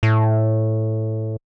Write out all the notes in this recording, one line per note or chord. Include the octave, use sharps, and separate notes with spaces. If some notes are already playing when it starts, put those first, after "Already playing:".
A2